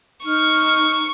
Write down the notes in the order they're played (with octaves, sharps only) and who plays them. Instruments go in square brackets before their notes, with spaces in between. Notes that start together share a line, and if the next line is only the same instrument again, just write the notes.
[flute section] D#4 F6 [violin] C#6